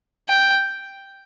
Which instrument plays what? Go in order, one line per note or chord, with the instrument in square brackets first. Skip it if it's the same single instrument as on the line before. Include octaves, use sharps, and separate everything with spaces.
[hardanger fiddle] G5